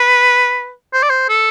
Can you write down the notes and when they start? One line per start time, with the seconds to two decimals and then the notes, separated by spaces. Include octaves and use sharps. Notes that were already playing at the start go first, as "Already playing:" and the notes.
Already playing: B4
0.93 C5
1.02 D5
1.10 C5
1.29 A4